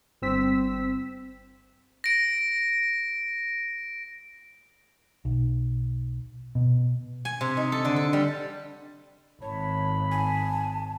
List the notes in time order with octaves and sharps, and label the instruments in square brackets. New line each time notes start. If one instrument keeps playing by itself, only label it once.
[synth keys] G1 C4 E6 B6
[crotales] A#6 D7
[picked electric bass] B1
B2
[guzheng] G#5
C3
D#4
A4
D3
A4
G3
[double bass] G#1 [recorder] C#5 [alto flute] A5 [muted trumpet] B5
[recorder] G#5 [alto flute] A5